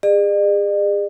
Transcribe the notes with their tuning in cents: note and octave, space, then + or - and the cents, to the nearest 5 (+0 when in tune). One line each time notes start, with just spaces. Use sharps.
G#4 -35 D5 +45